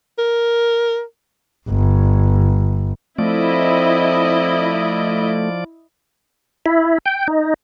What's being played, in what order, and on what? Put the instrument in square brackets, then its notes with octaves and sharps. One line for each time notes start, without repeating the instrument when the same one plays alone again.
[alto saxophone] A#4
[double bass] G1
[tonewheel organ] F3 D5 [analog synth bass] A3 [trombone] C4 [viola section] E4 D#5
[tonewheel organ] E4
G5
D#4